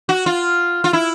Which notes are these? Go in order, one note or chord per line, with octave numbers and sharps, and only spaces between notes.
F#4
F4
F4
E4